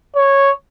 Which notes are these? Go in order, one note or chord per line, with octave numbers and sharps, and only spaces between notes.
C#5